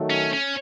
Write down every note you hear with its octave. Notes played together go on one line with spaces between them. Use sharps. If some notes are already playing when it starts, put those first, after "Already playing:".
Already playing: D#3 F#3 A3
C#4
C#4